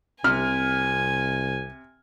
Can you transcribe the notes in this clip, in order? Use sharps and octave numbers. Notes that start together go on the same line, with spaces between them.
C2 C3 G#5 F6